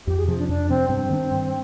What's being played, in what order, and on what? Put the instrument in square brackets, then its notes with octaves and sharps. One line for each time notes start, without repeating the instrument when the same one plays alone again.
[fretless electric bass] F2 [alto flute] G4
[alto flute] G#4
[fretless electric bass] C3 F3 [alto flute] G#4
[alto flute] D4
[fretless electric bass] F2 [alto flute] D4
[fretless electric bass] C3 F3 [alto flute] C4
[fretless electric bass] G2 [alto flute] C4
[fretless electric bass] D#3 A#3 D4
G2